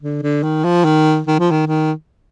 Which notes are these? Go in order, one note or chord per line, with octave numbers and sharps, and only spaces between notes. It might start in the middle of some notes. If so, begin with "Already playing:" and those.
D3
D3
D#3
F3
D#3
D#3
F3
D#3
D#3